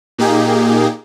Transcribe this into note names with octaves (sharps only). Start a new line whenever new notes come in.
A#2 A#3 D#4 G4 G#4